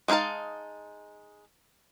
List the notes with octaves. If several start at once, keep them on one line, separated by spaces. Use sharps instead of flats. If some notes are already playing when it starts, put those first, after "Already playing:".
G#3 D4 D#4 F5 A5